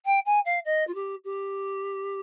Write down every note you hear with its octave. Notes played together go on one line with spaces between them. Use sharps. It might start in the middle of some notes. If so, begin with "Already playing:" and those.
G5
G#5
F5
D#5
F4
G4
G4